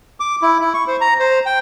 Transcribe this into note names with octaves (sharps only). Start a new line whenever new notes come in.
D6
E4
E4
C#6
C5
A#5
C5
G5